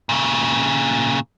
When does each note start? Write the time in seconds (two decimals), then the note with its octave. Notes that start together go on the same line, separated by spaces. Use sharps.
0.09 A#2 C#3